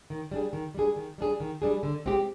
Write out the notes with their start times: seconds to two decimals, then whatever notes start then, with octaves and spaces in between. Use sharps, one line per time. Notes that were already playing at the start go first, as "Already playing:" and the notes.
0.10 D#3
0.31 G3 D4 G#4
0.53 D#3
0.74 G3 D4 G#4
0.96 D#3
1.18 G3 D4 G#4
1.40 D#3
1.62 G3 D4 G#4
1.83 D3
2.06 G#3 C4 G4